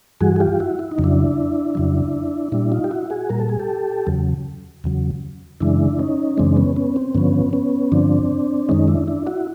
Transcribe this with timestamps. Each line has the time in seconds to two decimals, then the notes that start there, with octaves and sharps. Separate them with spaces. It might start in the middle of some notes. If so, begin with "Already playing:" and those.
0.21 G2 E3 G3 F#4 G#4
0.36 G#4
0.40 F4 G4
0.60 E4 F#4
0.79 E4
0.91 D#4
0.98 F2 C#3 F#3
1.04 D4 E4
1.75 F2 C#3 F#3
2.52 A#2 G3 D4 E4
2.72 D#4 F4
2.84 G4
2.91 E4 F#4
3.10 F#4 G#4
3.29 A#2 G3 A#4
3.40 A4
3.49 G#4
3.60 G4 A4
4.07 E2 C#3 F#3
4.84 E2 C#3 F#3
5.60 F#2 C#3 E3 G#3 D4 E4
5.99 C#4 D#4
6.37 F#2 C#3 E3 G#3 C4 D4
6.57 B3 C#4
6.76 B3 C#4
6.96 C4
7.15 G2 D3 F3 B3 C#4
7.53 B3 C#4
7.92 G2 D3 F3 C4 D4
8.69 F#2 D#3 G#3 C#4 D#4
8.88 D4 E4
9.08 D4 E4
9.27 E4 F#4